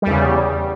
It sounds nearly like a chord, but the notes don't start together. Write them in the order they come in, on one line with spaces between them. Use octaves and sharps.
G3 E2 C#3